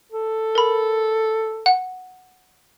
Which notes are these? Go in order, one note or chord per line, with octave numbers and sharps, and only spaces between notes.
A4
A#4 B5
F#5